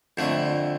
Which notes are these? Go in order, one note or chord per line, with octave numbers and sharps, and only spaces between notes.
F2 D3 A3